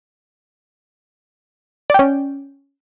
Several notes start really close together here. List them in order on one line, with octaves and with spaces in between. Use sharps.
D5 G5 C#4